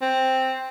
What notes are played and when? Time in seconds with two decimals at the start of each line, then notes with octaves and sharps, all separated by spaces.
0.01 C4